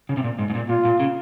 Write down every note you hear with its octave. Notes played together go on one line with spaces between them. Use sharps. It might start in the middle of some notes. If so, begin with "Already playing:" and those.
C#3
C3
A#2
G#2
G#2
A#2
A#2 F4
A#2
C#3